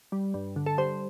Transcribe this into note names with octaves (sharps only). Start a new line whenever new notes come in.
G3
G2
D3
A4
G3 C5